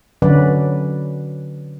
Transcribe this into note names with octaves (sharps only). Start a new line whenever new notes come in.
D3 F#3 C#4 B4 D5